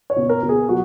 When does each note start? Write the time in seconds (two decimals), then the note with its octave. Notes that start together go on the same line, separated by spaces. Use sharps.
0.10 C#5
0.16 B2
0.29 A#4
0.43 B2
0.49 G#4
0.69 F#3 F#4